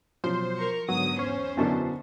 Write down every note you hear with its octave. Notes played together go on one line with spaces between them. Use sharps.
B2 F3 F#3 C5
A#4 C#6
G#2 D3 F#3 B3 D#6
G#1 E2 C#4 C5
F#2 B2 D3 E4 A5 C#6